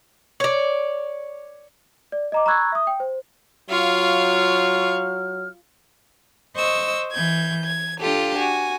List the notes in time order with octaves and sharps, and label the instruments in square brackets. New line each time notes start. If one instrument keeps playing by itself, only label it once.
[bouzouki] C#5 D5
[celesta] D5
D#5 A#5 D6
A#5 B5 C#6 E6 F#6 G#6
E5 D#6
G5
C5
[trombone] F#3 [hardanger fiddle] F4 [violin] F5 C#6 [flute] F6
[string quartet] C5 D#5 C#6 E6
E3 G6 G#6
G#6
D4 F4 G4 A4
F#4 G#5